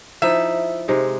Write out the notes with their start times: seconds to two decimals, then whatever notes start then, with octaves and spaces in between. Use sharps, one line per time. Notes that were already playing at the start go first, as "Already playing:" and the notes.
0.22 F3 D#4 E4 E5
0.88 C3 G#3 D#4